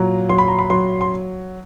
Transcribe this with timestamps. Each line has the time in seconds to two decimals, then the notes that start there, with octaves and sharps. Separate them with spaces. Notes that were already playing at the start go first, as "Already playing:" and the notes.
Already playing: A#2 F#3 A#5
0.29 F#3 C6
0.38 B5
0.48 A#5
0.59 B5
0.70 F#3 C6
1.01 C6